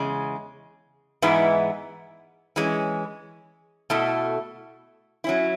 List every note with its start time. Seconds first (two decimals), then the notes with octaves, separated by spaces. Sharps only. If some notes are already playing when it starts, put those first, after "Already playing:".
Already playing: E2 C#3 G#3
1.22 G#2 E3 G#3 B3 E4
2.56 E3 G#3 C#4
3.90 B2 A3 E4 A4
5.24 F#3 C#4 E4